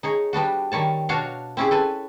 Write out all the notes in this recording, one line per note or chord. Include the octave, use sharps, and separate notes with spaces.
D#4 G#4 C#5
G3 B3 D4 F#4
D#3 G3 C#5 A5
B2 D4 F#4 C#5 F5
C4 C#4 E4 G4 G#4
A4 B4 G#5